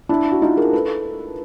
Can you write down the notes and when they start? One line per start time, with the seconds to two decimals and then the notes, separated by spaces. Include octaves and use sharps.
0.09 D4 E4
0.31 F#4
0.42 D#4 F4
0.57 G#4 A#4
0.73 A4 B4